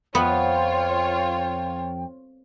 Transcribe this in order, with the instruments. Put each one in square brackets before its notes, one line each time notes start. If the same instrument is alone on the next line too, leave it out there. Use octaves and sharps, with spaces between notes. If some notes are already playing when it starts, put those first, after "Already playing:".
[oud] F2 [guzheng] B3 [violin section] F4 C#5 [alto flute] G5